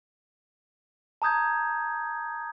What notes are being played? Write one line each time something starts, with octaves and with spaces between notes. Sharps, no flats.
A5 A#5 D#6 G6 G#6